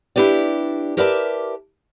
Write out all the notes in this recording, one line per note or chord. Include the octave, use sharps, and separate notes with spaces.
D4 E4 G4 B4 D5
G4 A#4 B4 D5 E5 A5